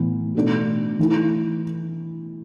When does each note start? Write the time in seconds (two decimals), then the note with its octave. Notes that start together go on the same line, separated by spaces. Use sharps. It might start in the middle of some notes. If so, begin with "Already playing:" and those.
Already playing: A2 E3 B3
0.35 B2 A3 D4
0.99 E3 A3 E4